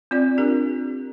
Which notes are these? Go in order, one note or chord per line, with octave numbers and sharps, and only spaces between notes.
C4 F4 D5
D4 G4 A#4